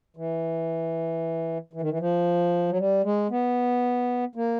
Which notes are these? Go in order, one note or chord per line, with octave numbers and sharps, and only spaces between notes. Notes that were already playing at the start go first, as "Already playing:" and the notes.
E3
E3
D#3
E3
F3
F#3
G3
G#3
B3
A#3